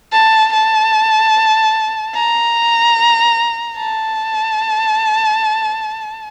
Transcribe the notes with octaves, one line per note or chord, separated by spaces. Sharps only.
A5
A5
A#5
A5